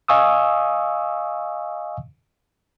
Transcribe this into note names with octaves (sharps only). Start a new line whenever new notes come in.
D#5 F5 G#5 C#6 D#6 E6